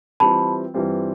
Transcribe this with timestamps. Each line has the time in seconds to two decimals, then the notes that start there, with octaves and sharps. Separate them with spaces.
0.20 E3 G3 C4 F4 A5 B5
0.74 G2 E3 G3 C4 F4